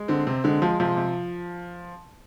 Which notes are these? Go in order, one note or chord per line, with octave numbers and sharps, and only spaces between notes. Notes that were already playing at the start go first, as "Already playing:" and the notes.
Already playing: G#3
D3 C4
C3 C4
D3 G#3
F3 G#3
C3 F3
C3